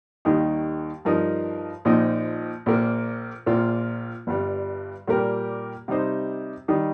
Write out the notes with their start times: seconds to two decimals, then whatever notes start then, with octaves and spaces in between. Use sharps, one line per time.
0.25 D#2 D#3 G3 D#4
1.05 G2 F3 D#4 A#4
1.85 A#1 A#2 F3 D#4
2.66 A#1 A#2 A#3
3.46 A#1 A#2 A#3 F4
4.27 G1 G2 G3
5.07 A#2 G3 A#3 G4 A#4
5.88 C3 G3 D#4 C5
6.68 D#3 G3 D#4